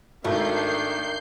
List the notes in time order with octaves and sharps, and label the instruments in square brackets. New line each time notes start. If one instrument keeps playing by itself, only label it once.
[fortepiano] G#1 [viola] D#3 D4 [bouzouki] A3 [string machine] G6 C7